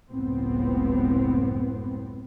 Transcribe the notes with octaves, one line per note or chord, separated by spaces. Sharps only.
F#1 C#2 A2 B3 C4